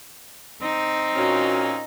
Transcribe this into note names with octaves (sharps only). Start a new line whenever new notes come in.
C4 D#4
A#2 C#4 F#4